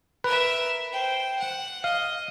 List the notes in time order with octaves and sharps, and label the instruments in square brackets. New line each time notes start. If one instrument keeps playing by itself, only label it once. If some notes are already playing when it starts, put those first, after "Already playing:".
[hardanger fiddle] A#4 E5 [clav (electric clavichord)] B4
[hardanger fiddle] C5 G5
F#5
[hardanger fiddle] D#5 [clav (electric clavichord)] F5